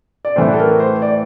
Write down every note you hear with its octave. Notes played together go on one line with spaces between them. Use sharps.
D5
A2 E3 A3 C5
A4
A#4
C5
D5